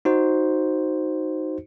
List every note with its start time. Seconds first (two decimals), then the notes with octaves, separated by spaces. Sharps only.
0.05 D#4 F#4 C5